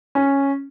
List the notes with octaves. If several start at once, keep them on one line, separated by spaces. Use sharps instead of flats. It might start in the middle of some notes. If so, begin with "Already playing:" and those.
C#4